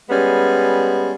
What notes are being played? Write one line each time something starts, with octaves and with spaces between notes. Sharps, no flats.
G3 G#3 B3 C#4